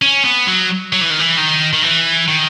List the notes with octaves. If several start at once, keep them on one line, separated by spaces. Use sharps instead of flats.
C#4
B3
F#3
F#3
E3
D#3
E3
D#3
D#3
E3
D#3